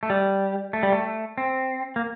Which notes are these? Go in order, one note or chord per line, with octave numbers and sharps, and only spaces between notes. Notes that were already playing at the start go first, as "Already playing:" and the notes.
A3
G3
A3
G3
A3
C4
A#3